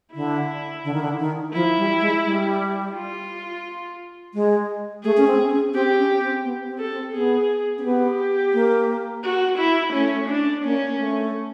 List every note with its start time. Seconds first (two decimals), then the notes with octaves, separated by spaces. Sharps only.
0.14 D3 E4
0.84 D3
0.94 D#3
1.03 D3
1.19 D#3
1.54 F3 E4
1.77 G3
2.01 G#3
2.25 G3
2.94 F4
4.34 G#3
5.03 A3 G#4
5.17 C#4
5.27 C4
5.51 C#4
5.74 C4 G4
5.98 C#4
6.21 C4
6.44 B3
6.68 C4
6.78 A4
6.91 C4
7.13 B3 G#4
7.78 C4
7.84 B3 G4
8.54 A#3
9.24 F#4
9.58 E4
9.93 A3 C#4
10.29 D4
10.64 A#3 C#4
10.87 A#3
10.99 A3